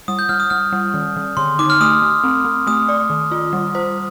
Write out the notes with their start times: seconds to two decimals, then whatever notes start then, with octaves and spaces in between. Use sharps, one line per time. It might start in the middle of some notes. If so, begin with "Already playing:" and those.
0.08 G3 D#6
0.19 G6
0.29 G3 F6
0.40 D#6
0.50 G3 F6
0.73 G3
0.94 D#3
1.16 D#3
1.37 D3 C6
1.59 D#4 D6
1.70 F6
1.81 A3 D#6
2.02 A3
2.24 C4
2.45 C4
2.67 A3 D#6
2.89 D5
3.10 D#3
3.32 F4
3.53 G3
3.75 C5